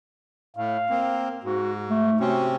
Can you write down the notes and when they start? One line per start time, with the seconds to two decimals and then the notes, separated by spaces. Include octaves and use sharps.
0.57 A2 F5
0.89 A#3 C4
1.44 G#2 F#4
1.90 A3
2.20 C3 C4 C#4 F#4